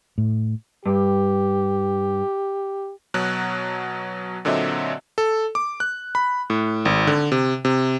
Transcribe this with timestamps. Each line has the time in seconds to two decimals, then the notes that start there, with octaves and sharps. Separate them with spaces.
0.18 A2
0.86 G2 G4
3.14 B2 F#3 F#6
4.45 A#2 D3 F#3 C4 D#5 E5
5.18 A4
5.55 D6
5.80 F#6
6.15 B5
6.50 A2
6.85 G#1
7.07 D3
7.32 C3
7.65 C3